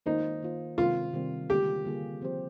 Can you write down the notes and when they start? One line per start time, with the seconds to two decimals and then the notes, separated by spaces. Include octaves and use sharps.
0.06 D#3 A#3 D#4 F4 C5
0.42 D#3 A#3 F4 C5
0.78 C3 D#3 G3 C4 F4
1.13 C3 D#3 G3 C4
1.49 D3 G3 A#3 F4 G4 G#4
1.85 D3 G3 A#3 F4 G#4
2.22 F3 C4 G4 C5